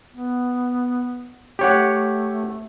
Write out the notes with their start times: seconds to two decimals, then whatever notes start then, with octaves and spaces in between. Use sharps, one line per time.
0.12 B3
1.59 A3 G4 C#5 F#5